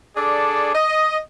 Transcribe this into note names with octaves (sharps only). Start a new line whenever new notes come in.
D4 G#4 A4 D5
D#5